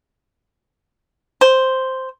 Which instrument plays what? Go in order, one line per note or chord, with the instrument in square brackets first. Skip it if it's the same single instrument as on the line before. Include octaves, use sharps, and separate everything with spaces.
[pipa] C5